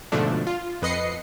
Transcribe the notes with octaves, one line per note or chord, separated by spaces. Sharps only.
G#2 B2 D3 F3 A3 D4
F4
F2 B4 D#5 C7 C#7